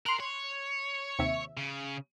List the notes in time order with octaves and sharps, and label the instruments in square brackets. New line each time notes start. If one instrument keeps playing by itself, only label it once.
[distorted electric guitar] A#4 [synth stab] C6 F#6
[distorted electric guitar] C#5
[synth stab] D#2 C3 E5
[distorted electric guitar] C#3